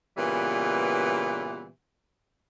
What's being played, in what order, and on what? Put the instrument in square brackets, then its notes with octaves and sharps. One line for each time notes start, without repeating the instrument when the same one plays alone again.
[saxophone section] A#2 C#3 E3 G3 B3